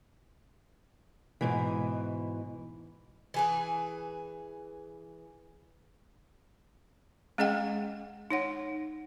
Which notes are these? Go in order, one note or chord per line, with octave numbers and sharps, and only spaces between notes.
G#2 B2 E3
E3 G#4 B4
G#3 C#4 G#4 D#5 F#5 G5
D#4 C#5 F#5